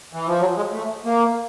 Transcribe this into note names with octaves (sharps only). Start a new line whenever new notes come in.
E3
F3
F#3
G#3
A3
A#3